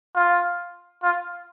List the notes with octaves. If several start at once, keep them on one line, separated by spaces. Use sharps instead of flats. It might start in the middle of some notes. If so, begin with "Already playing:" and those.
F4
F4